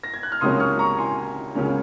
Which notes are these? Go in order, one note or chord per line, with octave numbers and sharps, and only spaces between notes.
A#6
G#6
F#6
F6
C#2 C3 F#3 A#3 C#4 C6 D#6
C#6 F6
A#5 C#6
G#5 C6
C#2 C#3 F#3 A#3 C#4